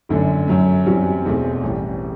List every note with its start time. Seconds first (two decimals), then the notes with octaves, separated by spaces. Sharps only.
0.09 G1 F#2 D3 A3
0.47 F#2 F#3 A3
0.86 F#2 E3 G3 C4 F#4
1.25 E1 E2 B2 A3 C4
1.63 A1 A2 E3 G3